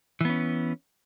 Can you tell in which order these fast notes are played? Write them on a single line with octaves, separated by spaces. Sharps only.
E3 B3 C#4